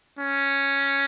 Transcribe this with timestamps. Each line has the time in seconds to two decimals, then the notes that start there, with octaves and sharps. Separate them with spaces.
0.19 C#4